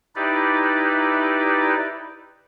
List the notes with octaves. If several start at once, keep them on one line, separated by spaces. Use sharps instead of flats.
D#4 E4 G4 B4 D5